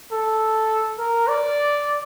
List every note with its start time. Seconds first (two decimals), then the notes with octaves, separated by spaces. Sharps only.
0.12 A4
0.99 A#4
1.28 D5